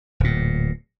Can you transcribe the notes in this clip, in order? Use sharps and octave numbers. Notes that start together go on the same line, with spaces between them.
D1 A#2